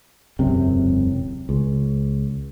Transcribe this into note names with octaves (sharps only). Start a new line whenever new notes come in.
E1 C#2 F#2 C3
C#2